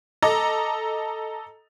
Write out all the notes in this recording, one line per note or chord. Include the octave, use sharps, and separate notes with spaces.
A4 D#5 A#5 D6